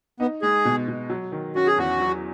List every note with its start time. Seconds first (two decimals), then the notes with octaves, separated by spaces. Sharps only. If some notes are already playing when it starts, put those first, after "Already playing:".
0.20 B3 D#4
0.42 G#3 G#4
0.65 B2
0.88 B2
1.10 F#3
1.32 D#3
1.56 C#4 F#4
1.67 G#4
1.78 E2 F#4
2.00 F#3